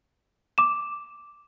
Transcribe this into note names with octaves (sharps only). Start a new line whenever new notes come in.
D6 E7